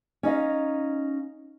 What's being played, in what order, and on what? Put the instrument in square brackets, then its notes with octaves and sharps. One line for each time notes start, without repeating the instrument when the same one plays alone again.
[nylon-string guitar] C#4 D#4 D#5 F5